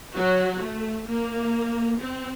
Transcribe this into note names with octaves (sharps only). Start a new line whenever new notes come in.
F#3 F#4
A3
A#3
C4